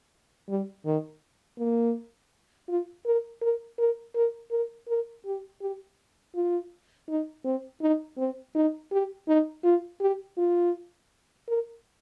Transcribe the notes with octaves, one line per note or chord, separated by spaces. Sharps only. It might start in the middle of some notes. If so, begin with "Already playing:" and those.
G3
D#3
A#3
F4
A#4
A#4
A#4
A#4
A#4
A#4
G4
G4
F4
D#4
C4
D#4
C4
D#4
G4
D#4
F4
G4
F4
A#4